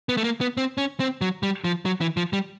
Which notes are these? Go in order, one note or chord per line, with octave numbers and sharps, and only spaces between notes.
B3
A3
A#3
B3
C4
C#4
C4
F#3
G3
F3
F#3
E3
F3
G3